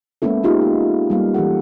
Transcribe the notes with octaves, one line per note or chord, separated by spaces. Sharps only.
G#3 A#3 B3 C#4 E4 A4
B3 D#4 F4 G4 G#4 F5
A#3
G3 A#3 F5
E3 G4 A4 F#5